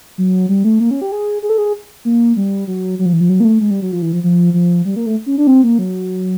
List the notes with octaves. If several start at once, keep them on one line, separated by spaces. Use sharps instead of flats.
F#3
G3
A3
A#3
C#4
G4
G#4
G#4
A4
G#4
A#3
G3
F#3
F#3
F3
E3
F3
F#3
A#3
A3
G#3
G3
F#3
F3
E3
F3
F3
F3
G3
A#3
A3
C#4
D4
C4
A#3
F#3